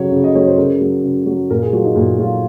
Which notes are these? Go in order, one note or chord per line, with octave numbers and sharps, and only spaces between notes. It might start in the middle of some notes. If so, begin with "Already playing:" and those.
Already playing: C#3 F#3 C#5
C#3
D#5
F#3 C#5
C5
C#3 A#4
F#3
C#3
F#3
A#2 A#4
G#4
F#3 F4
D#4
A#2 F4
F#3 F4